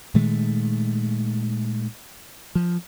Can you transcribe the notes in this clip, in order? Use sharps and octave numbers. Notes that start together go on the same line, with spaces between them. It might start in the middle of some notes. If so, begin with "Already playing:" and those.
A#2 D#3 G#3 A3
F3